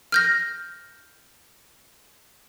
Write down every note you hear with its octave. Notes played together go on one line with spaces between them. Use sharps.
F6 G6 A#6